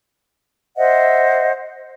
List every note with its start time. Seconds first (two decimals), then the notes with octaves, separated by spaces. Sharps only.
0.77 C5 D#5 E5 F#5